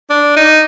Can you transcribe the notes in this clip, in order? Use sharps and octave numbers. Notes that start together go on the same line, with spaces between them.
D4
D#4